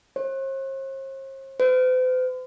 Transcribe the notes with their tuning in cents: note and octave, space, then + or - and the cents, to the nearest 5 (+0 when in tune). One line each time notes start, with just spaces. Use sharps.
C5 +45
C5 -45